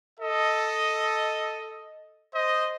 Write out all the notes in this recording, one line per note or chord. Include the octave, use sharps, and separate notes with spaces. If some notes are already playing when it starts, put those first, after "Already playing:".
A4 D#5
C5 D#5